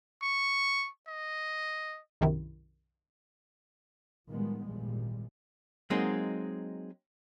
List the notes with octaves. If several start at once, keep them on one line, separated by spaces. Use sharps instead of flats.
C#6
D#5
B1 F#2 C3 D#3 E4
A2 D#3 F3 G3 G#3 B3
G#1 E2 A#2 F3 G3 G#3
F#3 G#3 A#3 C4 D#4